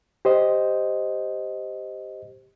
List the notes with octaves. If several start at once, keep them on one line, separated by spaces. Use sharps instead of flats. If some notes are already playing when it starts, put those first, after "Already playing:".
G4 C5 D#5